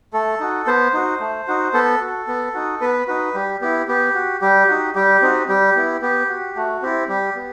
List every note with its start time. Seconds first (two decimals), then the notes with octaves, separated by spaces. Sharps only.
0.13 A3 A4
0.40 D#4 F#4
0.67 B3 C5
0.94 D#4 F#4
1.20 A3
1.48 D#4 F#4
1.74 B3 A4
2.01 F#4
2.27 B3
2.54 D#4 F#4
2.81 B3 B4
3.07 D#4 F#4 B4
3.34 G3 G4
3.61 B3 E4 G4
3.88 B3 G4
4.15 F#4
4.41 G3 G4
4.68 D#4 F#4
4.95 G3 G4
5.22 C4 D#4 F#4
5.49 G3 G4
5.76 B3 E4
6.02 B3 G4
6.29 F#4
6.56 A3 F#4
6.82 C4 E4 G4
7.09 G3 G4
7.35 B3